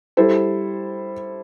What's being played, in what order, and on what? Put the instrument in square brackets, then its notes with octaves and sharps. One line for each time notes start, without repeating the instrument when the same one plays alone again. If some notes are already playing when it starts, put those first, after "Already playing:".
[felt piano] G3 E4 A4 C5